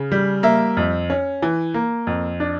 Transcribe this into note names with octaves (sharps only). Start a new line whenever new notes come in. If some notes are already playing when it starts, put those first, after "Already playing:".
Already playing: C#3
G3
A#3 E5
F2
C#4
E3
A#3
F2
D4